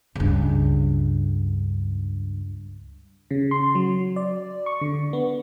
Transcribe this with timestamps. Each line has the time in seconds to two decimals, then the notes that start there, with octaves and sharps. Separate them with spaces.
0.15 C#2 G2
3.31 C#3
3.51 C6
3.75 F#3
4.16 D5
4.66 C#6
4.81 D3
5.13 B3